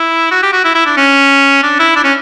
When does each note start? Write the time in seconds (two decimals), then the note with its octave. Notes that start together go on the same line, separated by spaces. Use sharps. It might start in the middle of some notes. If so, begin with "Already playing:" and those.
Already playing: E4
0.31 F#4
0.43 G4
0.53 F#4
0.65 E4
0.75 E4
0.86 D4
0.97 C#4
1.63 D4
1.79 E4
1.96 D4
2.04 C#4